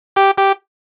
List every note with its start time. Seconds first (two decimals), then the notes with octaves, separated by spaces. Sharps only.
0.16 G4
0.38 G4